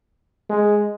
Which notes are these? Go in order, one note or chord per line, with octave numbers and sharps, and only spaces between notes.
G#3